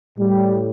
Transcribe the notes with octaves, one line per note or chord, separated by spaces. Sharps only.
A2 G3